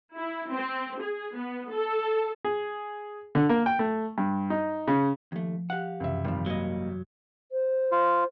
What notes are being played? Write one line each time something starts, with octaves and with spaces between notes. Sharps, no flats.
E4
C4
G#4
B3
A4
G#4
D3
A#3
G5
A3
G2
D#4
C#3
D#2 F3 A3
G4 F5 F#5 F#6
C#2 F#2 C3 E3 E5
G#1 D#3 F3 G3
F#3 A#3 D#5
C5
F4